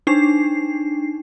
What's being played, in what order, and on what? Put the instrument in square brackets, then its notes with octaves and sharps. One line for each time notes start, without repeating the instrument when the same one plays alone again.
[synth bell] D4 D#4 C7